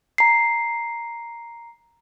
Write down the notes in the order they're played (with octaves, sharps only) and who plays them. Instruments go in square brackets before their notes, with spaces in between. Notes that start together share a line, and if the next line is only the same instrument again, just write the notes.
[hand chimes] A#5 C7